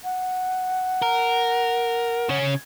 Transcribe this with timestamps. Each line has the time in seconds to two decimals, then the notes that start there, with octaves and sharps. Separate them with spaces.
0.04 F#5
1.02 A#4
2.29 C#3 C#4